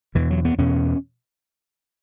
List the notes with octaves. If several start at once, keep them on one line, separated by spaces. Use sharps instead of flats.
E2 B2 E3
F#3
B3
E2 B2 C#4